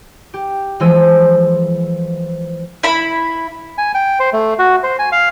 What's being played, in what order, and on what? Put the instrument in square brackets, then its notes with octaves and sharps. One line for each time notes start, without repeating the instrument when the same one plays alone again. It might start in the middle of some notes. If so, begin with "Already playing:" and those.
[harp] G4
E3 F3 G#3 C5 E6 D#7
[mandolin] E4 B5
[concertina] G#5
G5
C5
A3
F#4
C5
G#5
F5